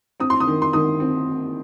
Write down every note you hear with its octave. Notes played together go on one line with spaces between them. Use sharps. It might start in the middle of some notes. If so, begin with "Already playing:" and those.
C4 D#6
C6
D#6
D#3
C6
D#3 D#6
C4